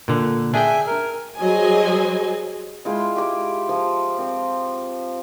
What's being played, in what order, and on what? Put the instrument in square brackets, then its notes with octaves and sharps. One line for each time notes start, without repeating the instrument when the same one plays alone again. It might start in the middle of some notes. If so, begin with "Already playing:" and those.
[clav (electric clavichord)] A#2 D3
[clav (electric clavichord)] D4 G#4 G5 [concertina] E5 G#5
[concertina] A#4
[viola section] F#3 G3 G#4 C5 D#5 G#5
[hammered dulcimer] G#3 E4 F4 G5
G4 D6
F3
C4 G5